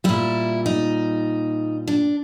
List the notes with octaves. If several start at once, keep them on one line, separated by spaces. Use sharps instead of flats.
A#2 G3 E4
D#4
D4